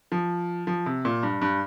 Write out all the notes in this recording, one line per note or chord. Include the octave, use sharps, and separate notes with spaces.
F3
F3
C3
A#2
G2
G2